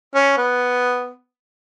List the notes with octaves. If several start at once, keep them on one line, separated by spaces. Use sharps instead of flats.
C#4
B3